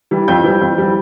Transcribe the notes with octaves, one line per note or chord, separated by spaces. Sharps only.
E3 G3
F2 G6
E3 G3
F2
E3 G3